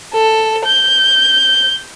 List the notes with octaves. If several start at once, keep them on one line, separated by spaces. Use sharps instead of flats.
A4
G6